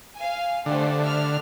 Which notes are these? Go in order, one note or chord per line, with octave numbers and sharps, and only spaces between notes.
F5 G#5
D3 A3 G4 C5
E5 F6